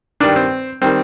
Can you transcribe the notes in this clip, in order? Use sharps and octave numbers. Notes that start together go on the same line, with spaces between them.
G2 D#3 G3 D4
C4
D#3 G3 C4